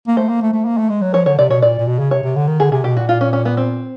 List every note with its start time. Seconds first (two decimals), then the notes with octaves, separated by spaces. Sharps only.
0.07 A#3
0.17 A3 C5
0.29 A#3
0.42 A3
0.54 A3
0.66 A#3
0.77 A3
0.89 G#3
1.02 F#3
1.14 F3 C#5
1.26 D3 C#5
1.39 C3 D5
1.50 B2 C#5
1.62 A#2 D5
1.79 A#2
1.87 B2
1.99 C#3
2.11 C3 C#5
2.23 C3
2.36 D3
2.48 D#3
2.60 D3 G#4
2.72 C3 G#4
2.84 B2 G4
2.97 A#2 F#4
3.09 F4
3.21 C#4
3.33 C#4
3.45 B3
3.57 C4